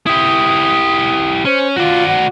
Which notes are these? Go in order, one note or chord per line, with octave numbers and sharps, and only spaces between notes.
E4 G4 D#6
C#4 C5
F4 F#4 D5
F#5